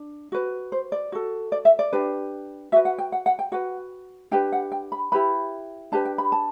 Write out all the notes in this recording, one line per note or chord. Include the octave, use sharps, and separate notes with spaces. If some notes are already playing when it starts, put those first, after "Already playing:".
Already playing: D4
F#4 B4
C5
D5
F#4 A4
D5
E5
D5
D4 G4 B4
F#4 B4 E5
F#5
G5
F#5
F#5
G5
F#4 B4 F#5
D4 G4 B4 G5
F#5
G5
B5
E4 G4 B4 B5
D4 G4 B4 A5
G5
B5
A5